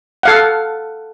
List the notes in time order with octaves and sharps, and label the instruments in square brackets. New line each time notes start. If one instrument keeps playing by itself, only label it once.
[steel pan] A4 F5 F#5